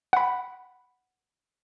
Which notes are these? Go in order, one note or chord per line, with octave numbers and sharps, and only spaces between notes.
F#5 B5